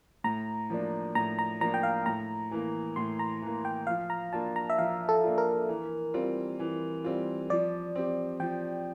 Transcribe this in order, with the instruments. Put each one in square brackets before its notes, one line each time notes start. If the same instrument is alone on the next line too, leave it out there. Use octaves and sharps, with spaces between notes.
[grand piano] A2 [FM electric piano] A#5
[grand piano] F3 A#3 D4
[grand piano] A2 [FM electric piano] A#5
[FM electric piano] A#5
[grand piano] F3 A#3 D4 [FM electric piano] A#5
[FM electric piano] G5
F5
[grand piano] A2 [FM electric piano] A#5
[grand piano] E3 A#3
[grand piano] A2 [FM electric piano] C6
[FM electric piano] A#5
[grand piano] E3 A#3
[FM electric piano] G5
[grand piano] F3 [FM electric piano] F5
[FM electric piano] A#5
[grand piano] A#3 D4 F4 [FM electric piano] A5
[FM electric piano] A#5
E5
[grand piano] F3 [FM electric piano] F5
[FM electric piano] A4
[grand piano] A#3 D4 F4
[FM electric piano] A#4
[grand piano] E3
G3 C4 F4
E3
G3 C4 F4
[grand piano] F3 [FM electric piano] D5
[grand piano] C4 G4
[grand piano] F3 [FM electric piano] G5